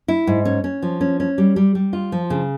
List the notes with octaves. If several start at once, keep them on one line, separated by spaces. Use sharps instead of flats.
E4
G#2
C#4
C#4
F3
C#4
C#4
G3
G3
G3
F4
F3
C#3